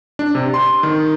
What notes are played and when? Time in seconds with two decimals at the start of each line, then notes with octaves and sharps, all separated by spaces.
0.19 D4
0.35 C3
0.54 C6
0.83 D#3